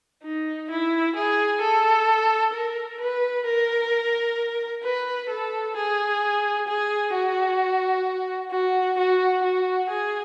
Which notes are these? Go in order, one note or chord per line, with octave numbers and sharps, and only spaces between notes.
D#4
E4
G#4
A4
A#4
B4
A#4
B4
A4
G#4
G#4
F#4
F#4
F#4
F#4
G#4